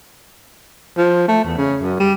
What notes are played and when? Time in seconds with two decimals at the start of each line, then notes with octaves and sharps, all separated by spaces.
0.97 F3
1.28 A3
1.45 E2
1.58 C#3
1.82 F#2
2.00 G3